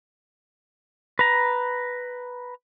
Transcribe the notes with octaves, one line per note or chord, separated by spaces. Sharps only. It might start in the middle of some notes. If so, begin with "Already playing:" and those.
B4 A#5